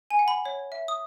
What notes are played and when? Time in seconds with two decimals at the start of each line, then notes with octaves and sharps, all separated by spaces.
0.10 G#5
0.19 F#5
0.28 B5
0.45 C#5
0.72 E5
0.88 D#6